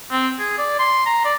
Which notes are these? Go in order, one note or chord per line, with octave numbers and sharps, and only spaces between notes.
C4
G#4
D5
C6
A#5
D5